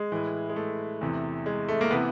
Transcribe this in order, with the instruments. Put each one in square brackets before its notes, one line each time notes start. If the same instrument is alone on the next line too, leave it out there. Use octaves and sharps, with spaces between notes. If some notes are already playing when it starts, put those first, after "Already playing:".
Already playing: [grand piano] G#3
A2 E3
G#3
A3
E2 C3 E3
G#3
A3
A#3
C3 E3 B3